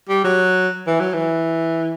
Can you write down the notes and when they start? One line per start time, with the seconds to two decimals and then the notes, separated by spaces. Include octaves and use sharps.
0.09 G3
0.24 F#3
0.87 E3
1.00 F#3
1.13 E3